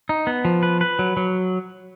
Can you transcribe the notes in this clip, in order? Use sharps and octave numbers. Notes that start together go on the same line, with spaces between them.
D#4
B3
F3
B4
B4
F#3
F#3